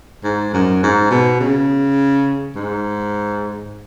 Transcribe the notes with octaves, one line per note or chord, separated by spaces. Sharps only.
G#2
F#2
G#2
B2
C#3
G#2